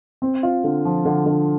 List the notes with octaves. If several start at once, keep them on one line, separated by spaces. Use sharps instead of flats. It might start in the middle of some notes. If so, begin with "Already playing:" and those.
C4
F4
D3
F3
D3
D3